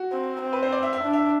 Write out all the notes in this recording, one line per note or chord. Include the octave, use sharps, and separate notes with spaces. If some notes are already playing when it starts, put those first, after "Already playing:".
Already playing: F#4
C4
C4
B4
C5
D5
E5
E5
D4
E5